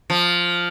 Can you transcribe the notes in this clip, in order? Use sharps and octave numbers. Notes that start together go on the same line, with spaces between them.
F3